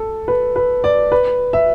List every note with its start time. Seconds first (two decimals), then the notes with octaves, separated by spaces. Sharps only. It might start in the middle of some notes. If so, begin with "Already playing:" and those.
Already playing: A4
0.28 B4
0.56 B4
0.84 D5
1.12 B4
1.53 E5